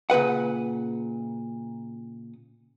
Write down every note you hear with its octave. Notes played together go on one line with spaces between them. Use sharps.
A#2 C#3 B4 F#5